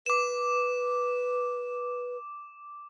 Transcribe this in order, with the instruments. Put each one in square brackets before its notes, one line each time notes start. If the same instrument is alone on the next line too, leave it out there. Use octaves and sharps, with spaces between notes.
[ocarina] B4 [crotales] D6 E7